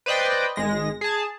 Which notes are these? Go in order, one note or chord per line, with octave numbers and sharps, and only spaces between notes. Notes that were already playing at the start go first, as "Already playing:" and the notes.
B4 C5 D5 D#5 G5
G#1 G#3 A#6
G#4 A5